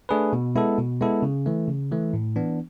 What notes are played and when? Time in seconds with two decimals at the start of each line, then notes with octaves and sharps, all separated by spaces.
0.09 A3 D4 G#4 B4
0.33 B2
0.56 G#3 B3 E4 A4
0.78 B2
1.01 G#3 B3 E4 A4
1.22 C#3
1.46 E3 A3
1.68 C#3
1.91 E3 A3
2.13 A2
2.36 E3 B3 D4